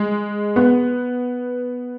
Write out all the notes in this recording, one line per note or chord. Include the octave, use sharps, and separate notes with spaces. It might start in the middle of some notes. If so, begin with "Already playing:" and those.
Already playing: G#3
B3